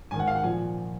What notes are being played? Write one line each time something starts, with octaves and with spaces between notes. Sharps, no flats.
G#2 D#3 G#5
F#5
F5
F#5
A#2 F3 G#5